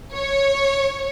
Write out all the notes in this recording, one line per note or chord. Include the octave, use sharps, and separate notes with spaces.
C#5